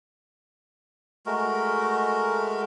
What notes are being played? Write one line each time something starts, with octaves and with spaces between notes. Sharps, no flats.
G#3 A3 F#4 A#4